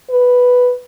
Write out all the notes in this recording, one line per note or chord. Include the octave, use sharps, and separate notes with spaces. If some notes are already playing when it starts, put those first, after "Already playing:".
B4